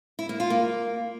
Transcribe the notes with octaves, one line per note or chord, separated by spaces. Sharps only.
E4
A#3
F4
A#3